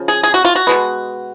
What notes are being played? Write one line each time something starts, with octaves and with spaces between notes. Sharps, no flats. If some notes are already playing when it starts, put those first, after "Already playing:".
Already playing: C#3 F3
G#4
G#4
F#4
F4
F#4
B2 G#3 B3